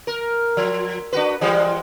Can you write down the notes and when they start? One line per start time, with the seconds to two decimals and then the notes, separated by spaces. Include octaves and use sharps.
0.07 A#4
0.57 F3
1.13 D4 F#4 B4
1.41 E3 G3 G#3